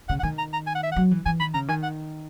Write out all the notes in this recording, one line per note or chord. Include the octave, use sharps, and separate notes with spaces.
C#3 F#5
F#5
D#3 G#5
A#5
A#5
G#5
F#5
E5
F#3 F#5
E3
E3 G#5
D#3 B5
C#3 A#5
D#3 G#5
F#5